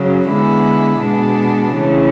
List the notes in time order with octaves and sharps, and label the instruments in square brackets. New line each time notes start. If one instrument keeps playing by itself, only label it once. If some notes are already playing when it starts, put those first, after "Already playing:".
Already playing: [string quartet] C#3 F#3
D3 G#3 B3 E4
B2 G#3 B3 D4
C#3 E3 A3